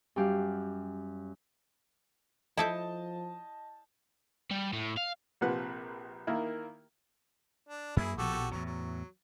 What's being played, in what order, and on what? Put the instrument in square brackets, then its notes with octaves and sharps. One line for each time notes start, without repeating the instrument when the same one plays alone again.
[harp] F#2 G3 G4 F5
[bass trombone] F3 [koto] E4 A4 E5 [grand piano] D#5 G6 [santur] A5
[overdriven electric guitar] G3
A2
F5
[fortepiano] A#1 C3 F3 B4 F#5
D#3 A#3 E4
[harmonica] D4
[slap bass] F#2 A#3 [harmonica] E4 G#4
[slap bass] A#1 B2 F3 [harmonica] F#4 G4 A4
[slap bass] E2 A2 [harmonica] F#3
[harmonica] F#3